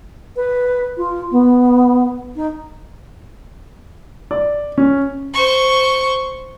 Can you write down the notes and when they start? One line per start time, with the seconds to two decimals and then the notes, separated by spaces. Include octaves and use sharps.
0.36 B4
0.97 F4
1.31 B3
2.36 D#4
4.31 D5
4.78 C#4
5.34 C5 C#6